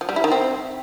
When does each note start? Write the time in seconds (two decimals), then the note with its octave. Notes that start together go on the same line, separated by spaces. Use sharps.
0.01 F3
0.09 G3
0.16 E4
0.24 D#3
0.32 C4